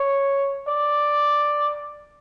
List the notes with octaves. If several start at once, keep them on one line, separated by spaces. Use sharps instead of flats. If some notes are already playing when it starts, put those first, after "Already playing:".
Already playing: C#5
D5